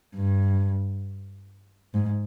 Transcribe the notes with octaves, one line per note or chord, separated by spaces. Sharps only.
G2
G#2